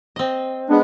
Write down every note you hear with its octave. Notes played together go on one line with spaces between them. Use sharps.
C4 D#5
G#3 B3 D4